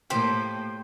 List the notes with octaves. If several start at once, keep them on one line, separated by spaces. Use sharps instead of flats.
A2 A#3 G4 C5